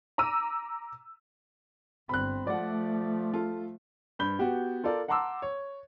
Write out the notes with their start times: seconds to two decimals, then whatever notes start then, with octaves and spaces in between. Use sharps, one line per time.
0.18 A#5 D6 E6 D#7
2.09 G1 C4 B5 F#6
2.47 F3 A3 D5 F#5
3.34 F4 A4
4.19 G2 B5 G6 G7
4.39 B3 F#4 G4
4.84 F4 A4 A#4 D5
5.08 F#5 A5 A#5 C6 D6 E6
5.42 C#5